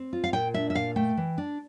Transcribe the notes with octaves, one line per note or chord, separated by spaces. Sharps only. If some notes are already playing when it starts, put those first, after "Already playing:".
Already playing: C4
F4
F5
A#2 G5
D4 E5
E5
A#2 F5
A3 G5
E3
D4